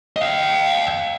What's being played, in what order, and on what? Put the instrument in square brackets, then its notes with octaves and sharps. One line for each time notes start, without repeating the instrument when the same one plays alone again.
[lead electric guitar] D#5 F5